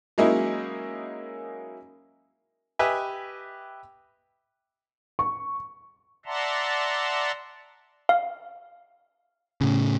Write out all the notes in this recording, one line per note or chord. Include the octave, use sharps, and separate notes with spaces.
F#3 G#3 A#3 C#4 D#4 E4
G4 B4 D#5 E5 G#5
C#6
D5 E5 F#5 A5 A#5 C6
F5
A2 C#3